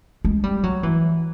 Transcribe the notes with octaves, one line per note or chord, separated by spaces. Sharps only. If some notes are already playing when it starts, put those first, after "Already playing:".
G#3
G3
F#3
E3